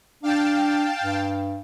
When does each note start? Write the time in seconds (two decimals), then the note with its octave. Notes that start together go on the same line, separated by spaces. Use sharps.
0.23 D4 F5 G5 A5
1.04 G2